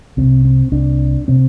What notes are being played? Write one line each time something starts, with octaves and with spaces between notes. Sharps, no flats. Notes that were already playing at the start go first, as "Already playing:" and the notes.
C2 C3 C4
C4
C2 C3 D4
C3 C4